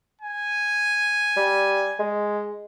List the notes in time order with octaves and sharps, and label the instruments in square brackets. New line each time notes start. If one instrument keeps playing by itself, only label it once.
[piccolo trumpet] G#5
[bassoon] G3
G#3